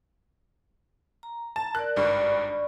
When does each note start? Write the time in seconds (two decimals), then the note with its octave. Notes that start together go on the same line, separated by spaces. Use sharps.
1.23 A#5
1.56 A5
1.75 A#4 D5 F#6
1.96 G#1 G2 D5 B5 C#6